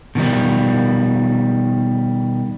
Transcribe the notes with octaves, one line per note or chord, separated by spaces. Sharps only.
B2 D#3 F3 G3